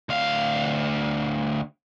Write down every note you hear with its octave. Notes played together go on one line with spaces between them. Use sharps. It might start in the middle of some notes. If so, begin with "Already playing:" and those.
D2 F5